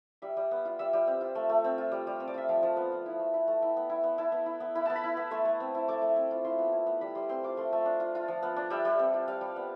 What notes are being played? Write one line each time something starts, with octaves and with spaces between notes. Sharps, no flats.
G3 E5
G3
B3
F4
G3 E5
G3
C4
F4
A3
A3
C4
F4
G3
G3
C4
D5
F4 E5
F3 F5
F3
B3
F4
E4
A3
E4
A3
E4 G5
B3
E4
B3
E4 A5
B3
E4
B3
E4 B5
B3 A5
B5
E4
B3
A3 C6
A3
C4
E4
A3 D6
A3
C4
F4
E4 C6
B3
E4
B3
G3 B5
G3 C6
C4 C6
F4 D6
A3 C6
A3
D4
F4
F4
F3
B3
D4
G3 E5
G3
C4
F4
G3 F5
G3
B3